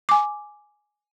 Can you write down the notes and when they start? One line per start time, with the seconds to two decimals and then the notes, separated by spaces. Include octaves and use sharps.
0.09 G#5 D6